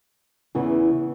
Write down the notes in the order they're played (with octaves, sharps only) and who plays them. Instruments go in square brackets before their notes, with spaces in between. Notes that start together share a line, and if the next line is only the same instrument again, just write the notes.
[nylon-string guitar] E2 C#3 E3